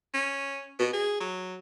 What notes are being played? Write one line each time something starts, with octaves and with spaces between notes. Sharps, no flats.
C#4
B2
G#4
F#3